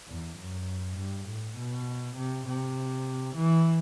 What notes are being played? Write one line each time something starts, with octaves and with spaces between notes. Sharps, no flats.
E2
F#2
G2
A2
B2
C3
C3
E3